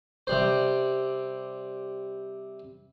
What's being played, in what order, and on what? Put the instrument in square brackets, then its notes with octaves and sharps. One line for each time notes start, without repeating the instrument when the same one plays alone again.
[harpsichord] C3 G3 C5